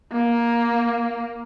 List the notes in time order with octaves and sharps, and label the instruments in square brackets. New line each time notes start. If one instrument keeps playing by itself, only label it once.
[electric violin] A#3